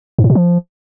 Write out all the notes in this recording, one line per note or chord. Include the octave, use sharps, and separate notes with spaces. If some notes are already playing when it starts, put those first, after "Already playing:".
G#2
A2
B2
F3